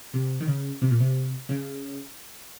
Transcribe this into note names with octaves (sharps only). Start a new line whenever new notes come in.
C3
D#3
C#3
C3
A#2
C3
C#3